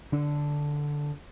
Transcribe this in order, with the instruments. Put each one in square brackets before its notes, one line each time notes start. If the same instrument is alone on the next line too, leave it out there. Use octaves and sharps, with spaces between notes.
[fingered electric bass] D3 D4